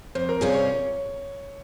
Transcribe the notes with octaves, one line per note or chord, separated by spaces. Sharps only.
F2 C5
A#4
C3 G3 C#4 F4 G#4
C#5